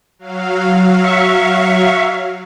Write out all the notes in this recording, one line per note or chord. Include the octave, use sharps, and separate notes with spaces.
F#3 F5
E5 C#6